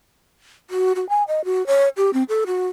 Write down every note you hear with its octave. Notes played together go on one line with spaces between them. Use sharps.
F#4
F#4
G#5
D#5
F#4
C#5
G4
C4
A4
F#4